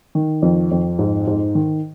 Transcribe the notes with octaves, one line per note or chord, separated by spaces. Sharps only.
D#3
F2
F2
G#2
G#2
D#3